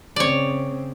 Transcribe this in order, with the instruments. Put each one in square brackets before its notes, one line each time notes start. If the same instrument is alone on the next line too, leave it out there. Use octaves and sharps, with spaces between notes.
[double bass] C#3 C4 [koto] C#5 D5